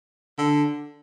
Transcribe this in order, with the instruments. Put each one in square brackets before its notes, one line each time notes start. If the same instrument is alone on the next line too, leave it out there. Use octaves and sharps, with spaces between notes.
[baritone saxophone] D3